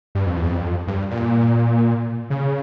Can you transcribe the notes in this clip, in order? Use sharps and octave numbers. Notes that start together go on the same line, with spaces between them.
G2
F2
E2
F2
G2
A#2
C#3